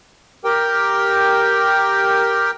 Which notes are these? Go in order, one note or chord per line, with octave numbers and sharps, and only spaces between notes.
G4 A#4 G5